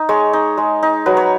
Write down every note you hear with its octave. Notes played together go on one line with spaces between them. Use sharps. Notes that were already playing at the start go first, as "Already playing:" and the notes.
Already playing: D#4
G#3 C#5
D#4
G#3
D#4
F#3 B4
C#5